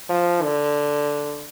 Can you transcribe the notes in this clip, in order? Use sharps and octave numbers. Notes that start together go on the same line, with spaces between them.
F3
D3